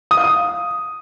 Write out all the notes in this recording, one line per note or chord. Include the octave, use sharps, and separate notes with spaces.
D#6
F5
D#6